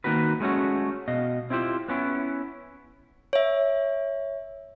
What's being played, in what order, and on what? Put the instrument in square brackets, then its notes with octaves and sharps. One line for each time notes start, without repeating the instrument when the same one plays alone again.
[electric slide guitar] D#3 A#3 C4 F#4 B4
G#3 A3 C#4 F#4
B2 D#5 F5
C4 E4 F4 G4 C5
B3 C#4 E4
[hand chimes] C#5 E5